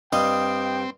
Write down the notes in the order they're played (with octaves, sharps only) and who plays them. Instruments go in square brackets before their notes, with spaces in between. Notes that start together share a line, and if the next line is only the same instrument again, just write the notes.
[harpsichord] G2 G3 F5 [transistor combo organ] C4 [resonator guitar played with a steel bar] D#5 [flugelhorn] G5